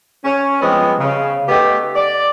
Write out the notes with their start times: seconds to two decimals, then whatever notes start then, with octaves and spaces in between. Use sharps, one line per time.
0.24 C#4
0.61 F3 G3 G#3 B3 C4
0.99 C#3
1.48 A3 B3 D#4 G4
1.95 D5